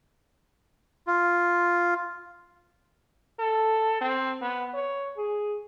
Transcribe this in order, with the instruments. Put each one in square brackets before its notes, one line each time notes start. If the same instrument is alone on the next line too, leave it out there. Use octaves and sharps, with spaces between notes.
[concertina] F4
[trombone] A4
C4
B3
C#5
G#4